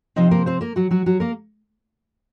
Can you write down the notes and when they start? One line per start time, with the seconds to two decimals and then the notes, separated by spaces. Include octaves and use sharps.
0.16 C3 F3 C4 D#4 D#5
0.31 A#3 A#4
0.46 C4 C5
0.61 A#3 A#4
0.76 F#3 F#4
0.91 F#3 F#4
1.06 F#3 F#4
1.20 A#3 A#4